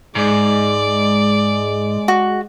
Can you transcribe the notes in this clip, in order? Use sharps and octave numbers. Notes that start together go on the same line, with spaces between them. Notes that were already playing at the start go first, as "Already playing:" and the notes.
G#2 G#3 D5
F#4